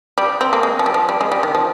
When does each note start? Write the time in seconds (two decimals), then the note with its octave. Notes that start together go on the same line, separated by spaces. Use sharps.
0.18 G3
0.41 C4
0.53 A#3
0.63 G#3
0.79 F3
0.86 G3
0.94 F3
1.09 G3
1.21 G#3
1.32 G3
1.43 D#3
1.55 F3